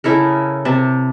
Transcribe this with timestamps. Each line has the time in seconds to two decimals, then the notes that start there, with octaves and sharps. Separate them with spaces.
0.04 C#3 E4 A4 A#4
0.65 C3 A5